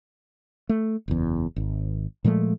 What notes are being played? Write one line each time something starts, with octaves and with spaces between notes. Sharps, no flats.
A3
F#1 E2
G#1
A#2 F3 G#3 A3